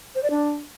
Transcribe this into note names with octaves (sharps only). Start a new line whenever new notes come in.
C5
D5
D4